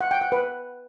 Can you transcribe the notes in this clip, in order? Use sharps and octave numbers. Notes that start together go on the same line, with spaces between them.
F#5
G5
F#5
B4